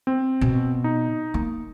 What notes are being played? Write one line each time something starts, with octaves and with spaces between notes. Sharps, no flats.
C4
B2
D#4
A#3